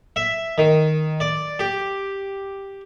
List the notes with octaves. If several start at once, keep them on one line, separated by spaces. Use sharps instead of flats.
E5
D#3
D5
G4